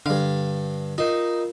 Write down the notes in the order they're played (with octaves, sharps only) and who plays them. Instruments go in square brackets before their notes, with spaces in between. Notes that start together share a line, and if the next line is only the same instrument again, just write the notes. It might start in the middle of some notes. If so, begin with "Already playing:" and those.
[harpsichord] G2 F5 [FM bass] D3
[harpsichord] D#4 [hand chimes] F4 A#4